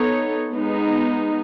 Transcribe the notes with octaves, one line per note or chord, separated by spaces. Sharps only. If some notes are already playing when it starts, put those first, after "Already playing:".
Already playing: B3 D#4 A4 C#5
G#3 B3 D#4